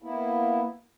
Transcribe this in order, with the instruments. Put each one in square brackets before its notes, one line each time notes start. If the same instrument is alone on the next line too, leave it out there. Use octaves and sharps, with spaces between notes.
[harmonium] A#3 B3 E4